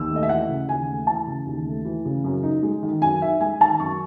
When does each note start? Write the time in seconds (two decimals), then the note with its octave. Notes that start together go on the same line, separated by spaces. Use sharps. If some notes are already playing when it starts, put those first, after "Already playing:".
Already playing: D#2 E6
0.11 A3
0.16 D#5
0.23 E5
0.29 E3 F#5
0.49 C#3
0.68 D#2 G#5
0.88 A3
1.07 E3 A5
1.27 C#3
1.46 D#2
1.66 A3
1.85 E3
2.05 C#3
2.24 F#2
2.43 D#4
2.63 G#3
2.83 D#3
3.01 F#2 G#5
3.22 D#4 E5
3.41 G#3 G#5
3.60 D#3 A5
3.80 F#2 C#6